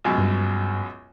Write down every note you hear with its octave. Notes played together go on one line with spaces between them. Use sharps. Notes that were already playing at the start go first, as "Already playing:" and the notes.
C#2 F#2 B2
G2